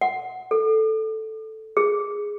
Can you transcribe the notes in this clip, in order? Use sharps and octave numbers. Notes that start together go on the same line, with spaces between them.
F#5
A4
G#4